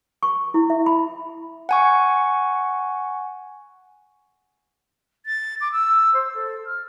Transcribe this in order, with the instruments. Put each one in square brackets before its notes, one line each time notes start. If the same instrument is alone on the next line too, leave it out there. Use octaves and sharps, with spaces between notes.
[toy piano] C#6
E4
E5
B5
[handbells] F#5 G#5 C#6
[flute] A6
D6
E6
C5
A4
F6